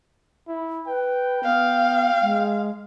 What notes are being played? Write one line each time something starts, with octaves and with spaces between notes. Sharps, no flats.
E4
B4 G5
B3 F5
G#3